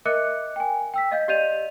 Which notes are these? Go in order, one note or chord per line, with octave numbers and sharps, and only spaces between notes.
A#4 D#5 E5 D6 F#6 C#7
G5 G#5
G5 E6 B6
D#5 F5 G6
G4 D5 D#5 G6 D#7 F7